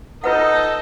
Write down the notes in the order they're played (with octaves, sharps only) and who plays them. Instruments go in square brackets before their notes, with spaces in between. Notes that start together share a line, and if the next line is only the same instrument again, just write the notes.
[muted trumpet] D#4 [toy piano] F4 B4 F#5 [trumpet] A4 [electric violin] D#5